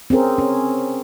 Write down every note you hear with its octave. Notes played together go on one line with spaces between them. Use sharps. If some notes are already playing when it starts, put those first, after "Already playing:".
C4 C#4 G#4 A#4
C#4